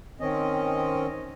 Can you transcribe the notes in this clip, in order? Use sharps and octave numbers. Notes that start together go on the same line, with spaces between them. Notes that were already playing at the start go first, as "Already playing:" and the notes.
D#3 C4 C#4 D#5